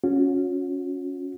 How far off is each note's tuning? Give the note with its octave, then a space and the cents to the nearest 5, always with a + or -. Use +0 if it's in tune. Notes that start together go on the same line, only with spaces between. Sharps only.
C#4 +0 F#4 -40